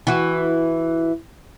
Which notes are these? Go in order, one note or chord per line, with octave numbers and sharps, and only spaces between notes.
E3 F#4